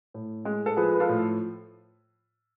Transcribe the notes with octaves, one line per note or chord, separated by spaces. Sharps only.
A2
G#3
A4
F3 G#4 B4
B4
F4 A4
A2